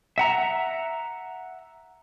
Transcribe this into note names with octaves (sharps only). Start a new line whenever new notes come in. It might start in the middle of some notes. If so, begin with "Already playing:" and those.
E5 F#5 A#5